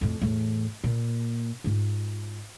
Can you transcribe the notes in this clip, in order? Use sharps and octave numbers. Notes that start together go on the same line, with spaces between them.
F2 A2
E2 A2
A#2
G#2 F4